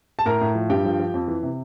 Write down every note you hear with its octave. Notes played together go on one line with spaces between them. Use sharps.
A5
A2 A#4 A#5
A2
F3
G2 G4 G5
F3
F3
F2
E3
C3